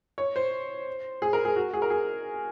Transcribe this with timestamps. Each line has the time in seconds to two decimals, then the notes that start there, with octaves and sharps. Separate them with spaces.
0.18 C#5
0.36 C5
1.22 G#4
1.33 A#4
1.45 G#4
1.56 F#4
1.73 G#4
1.82 A#4
1.90 G#4